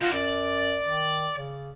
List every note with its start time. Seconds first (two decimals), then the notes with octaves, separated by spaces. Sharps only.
0.01 D#3 F4 F#4
0.13 F#2 D5
0.84 D#3
1.35 C#3